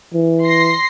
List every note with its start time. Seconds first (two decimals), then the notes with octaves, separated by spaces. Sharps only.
0.14 E3
0.44 C6 A#6 C7